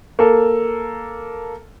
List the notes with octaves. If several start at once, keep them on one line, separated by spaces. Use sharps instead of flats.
A#3 A4